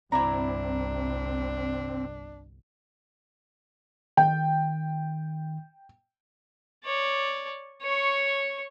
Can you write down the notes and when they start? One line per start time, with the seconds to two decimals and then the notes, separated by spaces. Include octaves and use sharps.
0.12 G1 C2 C4 D4 E4 D5 A#5
4.17 D#3 G5
6.84 C#5 D5
7.82 C#5 C#6